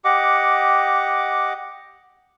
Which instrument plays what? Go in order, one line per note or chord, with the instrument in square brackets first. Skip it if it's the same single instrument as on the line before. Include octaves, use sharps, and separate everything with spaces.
[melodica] G4 D#5 F#5 D6